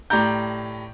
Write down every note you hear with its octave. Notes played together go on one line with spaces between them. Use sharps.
A2 G4 D5 A#5 G6